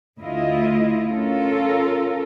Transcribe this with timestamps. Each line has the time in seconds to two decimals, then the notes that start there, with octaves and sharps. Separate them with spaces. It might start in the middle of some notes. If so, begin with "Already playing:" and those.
0.18 D2 A3 E4 F4 D#5
1.10 C#4 F4 A4 A#4